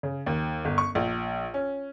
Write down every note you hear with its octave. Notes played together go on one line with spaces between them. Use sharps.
C#3
D#2
G1
C#6
A#1
C#4